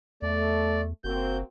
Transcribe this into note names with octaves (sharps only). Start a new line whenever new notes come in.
E2 A3 D5
F#1 A#3 C4 F#4 G6